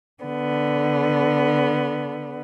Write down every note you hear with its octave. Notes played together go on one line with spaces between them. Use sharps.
D3 B3